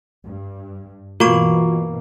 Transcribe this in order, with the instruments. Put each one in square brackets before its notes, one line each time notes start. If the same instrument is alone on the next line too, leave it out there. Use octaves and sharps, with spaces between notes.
[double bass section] G2
[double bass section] G2 B2 E3 [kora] A#3 [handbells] F4 F#4 C#6